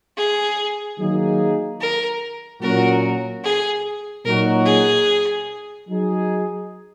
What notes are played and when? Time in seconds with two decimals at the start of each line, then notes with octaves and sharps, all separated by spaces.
0.17 G#4
0.99 D#3 F#3 A#3 D#4 G#4
1.80 A#4
2.61 A#2 F#3 C#4 F#4 A#4
3.44 G#4
4.25 A#2 F#3 D#4 F#4 A#4
4.65 G#4
5.88 F#3 D#4 G#4